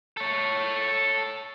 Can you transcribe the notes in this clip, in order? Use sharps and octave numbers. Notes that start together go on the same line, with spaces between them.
A4 C#5